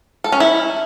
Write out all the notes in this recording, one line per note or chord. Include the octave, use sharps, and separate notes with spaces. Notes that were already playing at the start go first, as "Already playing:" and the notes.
A4
C#4
E4